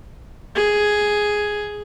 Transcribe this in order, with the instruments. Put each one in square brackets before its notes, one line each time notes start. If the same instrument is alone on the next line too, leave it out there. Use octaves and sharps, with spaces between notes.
[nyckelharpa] G#4